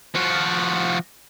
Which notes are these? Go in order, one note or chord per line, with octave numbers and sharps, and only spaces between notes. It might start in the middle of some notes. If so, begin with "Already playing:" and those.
F3 F#4